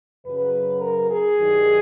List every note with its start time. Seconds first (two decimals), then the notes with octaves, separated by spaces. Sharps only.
0.25 F#2 C#3 F#3 B4
0.82 A#4
1.11 G#4
1.39 G2 D#3 F#3